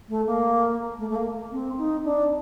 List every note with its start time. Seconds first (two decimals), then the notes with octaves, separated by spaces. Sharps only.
0.09 A3
0.26 A#3
0.98 A3
1.09 A3
1.15 A#3
1.52 C4
1.78 D#4
2.04 D4